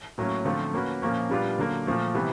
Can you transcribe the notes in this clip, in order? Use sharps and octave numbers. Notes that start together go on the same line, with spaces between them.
A2 F#3 A#3 C#4
D3 F3 A3 C4 F4
A#3 C#4 F#4 B4
A#2 F3 A#3 C#4
A#2 G3 B3 D4 F4
D3 F#3 A#3
A#2 F3 A3
C3 E3 G3 B3